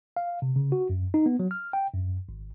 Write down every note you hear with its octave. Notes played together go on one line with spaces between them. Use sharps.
F5
C3
C#3
F#4
F#2
D#4
B3
F#3
F6
G5
F#2
G#1